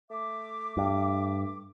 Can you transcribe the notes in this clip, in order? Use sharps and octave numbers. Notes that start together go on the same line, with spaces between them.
A3 E5 D6
G2